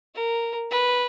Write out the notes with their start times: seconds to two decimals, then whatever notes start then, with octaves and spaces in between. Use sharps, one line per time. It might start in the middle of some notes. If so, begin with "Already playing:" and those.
0.15 A#4
0.70 B4